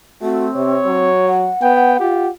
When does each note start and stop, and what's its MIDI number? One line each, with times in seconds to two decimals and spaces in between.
0.22 0.50 57
0.22 1.07 60
0.22 0.46 66
0.56 0.77 48
0.56 1.42 73
0.86 1.49 54
1.26 2.29 78
1.62 1.98 59
1.62 1.98 79
2.00 2.29 65
2.00 2.29 67